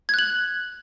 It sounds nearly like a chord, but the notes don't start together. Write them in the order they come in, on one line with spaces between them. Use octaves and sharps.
G#6 F#6 F#7